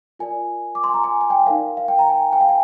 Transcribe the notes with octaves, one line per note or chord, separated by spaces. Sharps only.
F4 A#4 D5 G#5
D6
C6
G#5
A#5
G#5
G#5
G5
D#4 A#4 D5 F5
F5
G5
A#5
G#5
G5
F5
G#5